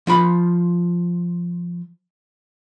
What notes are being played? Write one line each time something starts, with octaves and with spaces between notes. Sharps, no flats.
F3 F4 B5